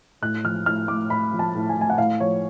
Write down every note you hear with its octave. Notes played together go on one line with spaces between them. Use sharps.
A2 F#6
F3 F6
A2 F6
A2 D6
A2 B5
F3
A5
A2
G#5
A2
G#5
F#5
A2 F5
F3 C#5